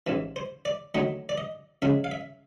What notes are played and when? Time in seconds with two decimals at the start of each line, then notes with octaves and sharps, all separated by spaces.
0.07 A1 G#2 E3
0.36 C5
0.65 D5
0.95 D#2 D3 F#3 A3 D#5
1.29 D5
1.38 D#5
1.82 C#2 C#3 F3 G#3 E5
2.04 F5
2.11 E5